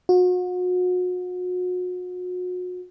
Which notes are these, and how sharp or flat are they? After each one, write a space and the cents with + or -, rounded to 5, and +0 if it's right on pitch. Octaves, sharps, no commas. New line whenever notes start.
F#4 -35